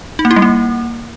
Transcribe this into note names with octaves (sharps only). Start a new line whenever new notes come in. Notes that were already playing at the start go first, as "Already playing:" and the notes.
D#4
A#3
E4
G3
A#3